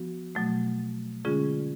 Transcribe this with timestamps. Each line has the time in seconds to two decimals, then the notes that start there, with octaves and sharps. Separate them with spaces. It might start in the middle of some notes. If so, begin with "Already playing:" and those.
Already playing: F3 B3 F#4
0.35 B2 F#3 A3
1.25 D3 G#3 C#4 F4 G#4